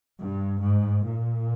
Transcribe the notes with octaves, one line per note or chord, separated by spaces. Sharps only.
G2
G#2
A#2